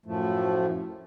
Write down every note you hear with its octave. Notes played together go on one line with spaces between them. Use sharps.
F#2 A2 F3 A3